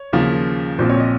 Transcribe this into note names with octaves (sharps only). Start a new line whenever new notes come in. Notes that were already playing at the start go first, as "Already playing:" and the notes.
Already playing: C#5
D#2 C#3 F3
A#1 A#2 F3 C4 C5
C#5
D#5